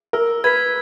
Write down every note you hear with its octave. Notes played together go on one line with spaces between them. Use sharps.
A#4 E6
B4 G#6 B6